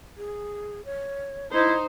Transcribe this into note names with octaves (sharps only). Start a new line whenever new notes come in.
G#4
C#5
D#4 E4 C5 D#5